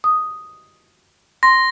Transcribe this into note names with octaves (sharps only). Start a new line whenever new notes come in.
D#6
C6 A#6